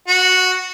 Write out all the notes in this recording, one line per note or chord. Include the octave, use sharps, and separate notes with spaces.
F#4